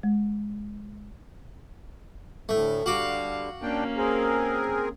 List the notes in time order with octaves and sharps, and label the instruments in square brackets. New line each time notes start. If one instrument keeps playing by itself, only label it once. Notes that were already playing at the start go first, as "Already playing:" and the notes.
[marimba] G#3
[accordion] D2 A2 [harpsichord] A3
[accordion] D3 G3 [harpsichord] F#4 D6 [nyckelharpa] F5
[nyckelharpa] A#3 C#4 [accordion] D4 G5
[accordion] C4 G#4 A#4